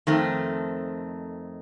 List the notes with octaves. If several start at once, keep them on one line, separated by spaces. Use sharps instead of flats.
F2 D#3 A3 C4